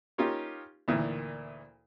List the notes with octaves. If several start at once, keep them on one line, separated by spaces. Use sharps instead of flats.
A#3 C#4 D#4 F4 G4
D2 A#2 D#3 E3